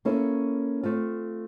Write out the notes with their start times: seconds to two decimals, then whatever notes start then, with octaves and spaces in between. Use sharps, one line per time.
0.05 A#3 C#4 E4 A4 C#5
0.83 A3 C4 F4